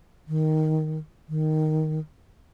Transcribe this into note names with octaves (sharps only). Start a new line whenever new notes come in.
D#3
D#3